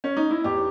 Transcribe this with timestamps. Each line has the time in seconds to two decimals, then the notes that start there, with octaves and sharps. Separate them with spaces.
0.04 C#4
0.17 D#4
0.31 E4
0.44 E2 G4